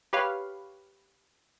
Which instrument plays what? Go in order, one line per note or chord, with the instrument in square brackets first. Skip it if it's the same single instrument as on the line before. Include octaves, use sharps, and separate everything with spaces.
[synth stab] G4 B4 C#5 F5